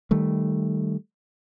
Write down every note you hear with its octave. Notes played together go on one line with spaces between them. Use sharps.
D#3 G3 A3